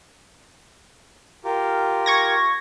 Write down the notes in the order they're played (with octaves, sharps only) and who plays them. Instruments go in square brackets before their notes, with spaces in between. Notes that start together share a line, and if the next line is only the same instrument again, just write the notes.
[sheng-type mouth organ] F4 G4 A#4
[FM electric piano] C#6 G#6 A#6